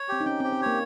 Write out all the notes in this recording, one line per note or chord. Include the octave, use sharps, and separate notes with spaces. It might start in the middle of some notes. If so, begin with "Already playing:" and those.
Already playing: C#5
C4 G4
D#4
C#4 G5
C4
G4
C4
A#3 C#5